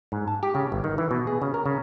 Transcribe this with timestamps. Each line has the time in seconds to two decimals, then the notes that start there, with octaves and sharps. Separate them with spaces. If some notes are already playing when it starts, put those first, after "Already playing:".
0.12 G#2
0.28 A5
0.43 G4
0.55 C#3
0.72 G1
0.84 D#3
0.98 E3
1.11 B2
1.27 G#4
1.42 C#3
1.54 A#4
1.66 C#3